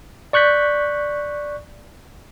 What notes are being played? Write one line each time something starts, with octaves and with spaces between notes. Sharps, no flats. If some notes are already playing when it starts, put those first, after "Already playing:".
D5 C#6 F#6 G6 B6